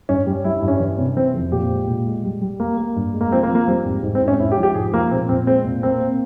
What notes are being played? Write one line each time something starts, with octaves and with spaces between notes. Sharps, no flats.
G2 C#4
G3
G3 E4
E4
G2
C#4
E3
C3
E3 C4
F2
A#2 G4
G#3
A#2
G#3
G3
G3
A#3
A#3
G2
G#3
A#3
F3 C4
A#3
F3
A#3
G3 C4
G#2
G#2
C4
G#2
C#4
G#2 E4
G4
F3
G4
G#2 G#4
F3 A#3
A#2 C4
A#2 C4
G#3 C4
A#2
A#3 C4
A#3